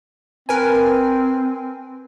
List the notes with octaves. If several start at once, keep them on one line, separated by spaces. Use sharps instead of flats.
C4 A#4 B4 G#5